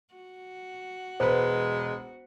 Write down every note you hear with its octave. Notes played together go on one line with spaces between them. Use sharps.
F#4
E1 G#3 B4 C5